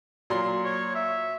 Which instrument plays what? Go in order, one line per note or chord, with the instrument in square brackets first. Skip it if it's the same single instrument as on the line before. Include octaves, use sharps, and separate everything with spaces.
[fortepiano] A#2 F#3 C6
[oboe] C#5
E5